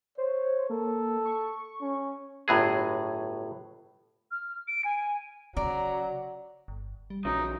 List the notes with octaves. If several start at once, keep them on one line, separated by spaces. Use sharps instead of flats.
C5 C#5
A#3 A4
C#6
C#4
G1 A2 F#3 G#4
F6
D7
G#5
C#3 F#3 D5 A#5
G1
G3
A#1 C#3 E3 F#3 D#4